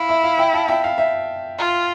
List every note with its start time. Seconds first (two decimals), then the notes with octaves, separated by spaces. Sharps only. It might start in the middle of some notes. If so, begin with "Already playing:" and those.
Already playing: E4 F5
0.09 E5
0.24 F5
0.38 E5 G5
0.53 F5 A5
0.68 E5 G5
0.84 F5
0.98 E5
1.58 F4